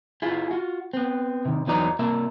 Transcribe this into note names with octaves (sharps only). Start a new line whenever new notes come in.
E4 F4 G#4
F4 F#4
B3 C4
C3 D#3
E2 E3 F#3 D#4 D5 A#5
C3 A#3 E5